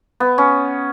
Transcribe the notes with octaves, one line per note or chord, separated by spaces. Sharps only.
B3
C#4